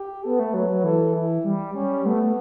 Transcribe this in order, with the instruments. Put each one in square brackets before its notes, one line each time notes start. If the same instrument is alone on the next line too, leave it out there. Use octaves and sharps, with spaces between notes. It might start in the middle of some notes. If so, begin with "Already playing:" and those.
Already playing: [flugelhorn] G4
[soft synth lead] B3 [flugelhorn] A4
[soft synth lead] A3
[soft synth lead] F#3 [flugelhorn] B4
[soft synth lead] F#3
[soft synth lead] E3 [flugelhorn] A4
[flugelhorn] E4
[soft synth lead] G3
[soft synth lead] G3 [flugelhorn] C#4
[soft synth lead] A3 [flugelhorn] B3